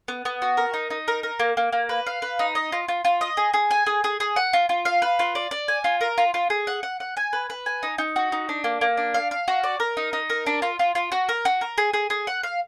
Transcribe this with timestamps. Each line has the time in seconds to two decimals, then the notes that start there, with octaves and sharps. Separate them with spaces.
0.08 B3
0.25 B3
0.42 F#4
0.57 A#4
0.74 D#4
0.90 D#4
1.08 A#4
1.23 A#4
1.40 A#3
1.57 A#3
1.72 A#3
1.89 B4
2.06 F5
2.22 B4
2.39 D#4
2.55 D#5
2.72 F4
2.88 F4
3.05 F4
3.21 D#5
3.37 G#4
3.54 G#4
3.71 G#5
3.86 G#4
4.04 G#4
4.20 G#4
4.36 F#5
4.53 F4
4.69 F4
4.85 F5
5.02 B4
5.19 F4
5.35 D5
5.51 D5
5.68 G#5
5.84 F4
6.01 A#4
6.18 F4
6.34 F4
6.50 G#4
6.67 F#5
6.83 F#5
7.00 F#5
7.17 G#5
7.33 B4
7.50 B4
7.66 G#5
7.83 D#4
7.98 D#4
8.16 F#4
8.32 D#4
8.49 D4
8.64 A#3
8.81 A#3
8.97 D4
9.14 F5
9.31 F5
9.48 F#4
9.64 D5
9.80 A#4
9.97 D#4
10.13 D#4
10.30 A#4
10.46 D4
10.62 F4
10.79 F4
10.95 F4
11.12 F#4
11.29 A#4
11.45 F#4
11.61 A#4
11.78 G#4
11.93 G#4
12.10 G#4
12.27 F#5
12.43 F5